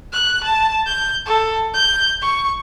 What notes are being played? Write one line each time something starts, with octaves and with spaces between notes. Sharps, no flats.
F#6
A5
G6
A4
G6
C#6